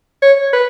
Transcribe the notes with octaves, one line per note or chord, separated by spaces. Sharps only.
C#5
B4